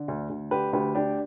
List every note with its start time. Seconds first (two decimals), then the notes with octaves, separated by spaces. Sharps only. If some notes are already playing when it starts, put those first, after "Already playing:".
Already playing: D3
0.08 D2
0.30 D2
0.51 D3 G4 B4
0.73 D2 G4 B4
0.94 D3 D4 G4